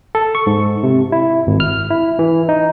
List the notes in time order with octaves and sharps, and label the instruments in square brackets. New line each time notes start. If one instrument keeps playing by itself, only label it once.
[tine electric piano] A4
C#6
G#2
C3
E4
G#1
F6
E4
E3
D#4